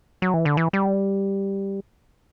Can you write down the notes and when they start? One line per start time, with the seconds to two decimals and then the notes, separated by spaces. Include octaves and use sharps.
0.22 F#3
0.34 E3
0.45 D3
0.57 E3
0.73 G3